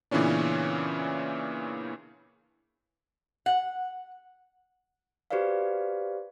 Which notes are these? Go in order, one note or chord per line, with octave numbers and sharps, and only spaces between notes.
A#2 C#3 E3 B3 C#4 D4
F#5
F#4 G4 B4 C5 D5 F5